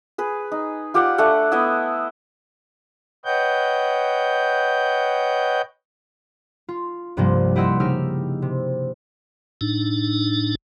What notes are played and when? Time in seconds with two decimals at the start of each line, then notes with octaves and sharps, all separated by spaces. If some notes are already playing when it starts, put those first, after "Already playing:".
0.18 G#4 B4
0.52 D#4
0.94 F4 G4 D5 F#5
1.18 A3 D4 A4 F#5
1.52 B3 E4 D#5 E5
3.25 B4 C#5 D#5 F#5 G5 G6
6.68 F4
7.17 C2 G2 C3 F3 G3 A#3
7.56 E4 G4 D#5 F#5 C6 E6
7.80 C#3 D#4 G4 E6 F6
8.42 C3
9.61 A2 D4 D#4